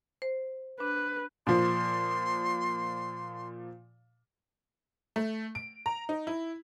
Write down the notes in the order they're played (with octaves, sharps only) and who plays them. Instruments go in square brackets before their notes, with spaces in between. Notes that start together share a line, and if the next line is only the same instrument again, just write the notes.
[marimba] C5
[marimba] D4 [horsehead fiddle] B4
[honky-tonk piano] A#2 F3 [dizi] C6
[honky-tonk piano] A3
D7
A#5
D#4
E4